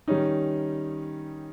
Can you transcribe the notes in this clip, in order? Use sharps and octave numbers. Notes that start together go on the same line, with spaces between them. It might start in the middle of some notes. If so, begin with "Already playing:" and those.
D#3 G3 C#4 D#4